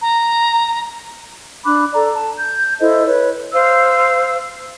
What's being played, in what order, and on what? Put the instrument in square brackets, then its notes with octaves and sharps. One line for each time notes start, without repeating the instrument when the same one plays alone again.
[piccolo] A#5
[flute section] D4 B5 D6 F#6
A4 D5 A#5
A5
G6
E4 A4 C5 D#5
B4 C#5
C5 F5 E6